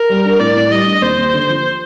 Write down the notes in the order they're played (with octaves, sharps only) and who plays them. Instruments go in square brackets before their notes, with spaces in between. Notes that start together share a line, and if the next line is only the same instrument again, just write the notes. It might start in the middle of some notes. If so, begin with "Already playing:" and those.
Already playing: [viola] A#4
[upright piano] G3
D4
[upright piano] A2 [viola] D5
[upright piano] A2
[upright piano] G3 [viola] D#5
[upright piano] D4
[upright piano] D#2 [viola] C5
[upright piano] D#2
D3
F3